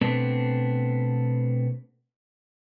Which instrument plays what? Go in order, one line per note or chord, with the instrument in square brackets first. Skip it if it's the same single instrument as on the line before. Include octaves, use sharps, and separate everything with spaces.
[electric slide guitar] B2 A3 B3 C4 D4